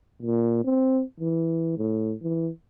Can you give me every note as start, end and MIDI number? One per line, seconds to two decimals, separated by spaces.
0.22 0.63 46
0.64 1.02 60
1.20 1.73 52
1.78 2.15 45
2.22 2.50 52